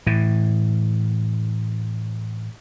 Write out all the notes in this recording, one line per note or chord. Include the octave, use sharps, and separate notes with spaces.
A2 E3